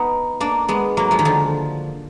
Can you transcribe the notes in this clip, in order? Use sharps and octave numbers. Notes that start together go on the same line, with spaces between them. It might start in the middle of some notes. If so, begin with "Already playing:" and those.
Already playing: B3 D#4
A#3 D4
G#3 B3
F#3 A#3
F3 G#3
D#3
D3 F3